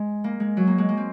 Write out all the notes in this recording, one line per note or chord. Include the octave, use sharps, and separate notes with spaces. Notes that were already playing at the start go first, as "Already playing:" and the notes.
Already playing: G#3
A#3
G#3
F#3
A#3
G#3
A#3
C4